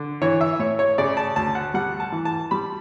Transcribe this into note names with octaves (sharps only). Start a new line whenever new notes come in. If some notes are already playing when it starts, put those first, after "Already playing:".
Already playing: D3
E3 C#5
E5
A2 C#5
C#5
C#3 D5
A5
D2 A5
F#5
G3 F#5
A5
E3
A5
G3 B5